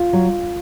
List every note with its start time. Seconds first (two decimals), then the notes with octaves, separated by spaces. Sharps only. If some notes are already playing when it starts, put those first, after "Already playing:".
Already playing: F4
0.13 F#3